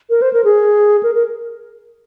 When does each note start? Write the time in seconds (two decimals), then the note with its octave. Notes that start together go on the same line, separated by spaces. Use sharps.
0.10 A#4
0.22 C5
0.33 A#4
0.44 G#4
1.03 A#4
1.15 A#4